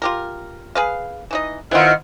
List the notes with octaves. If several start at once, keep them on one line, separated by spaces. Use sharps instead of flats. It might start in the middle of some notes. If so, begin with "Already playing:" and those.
F4 G4 A#4
G#4 B4 F5
E3 D#4 D#5
D#3 B3 C4 E4 F4 D#5 F#5 F6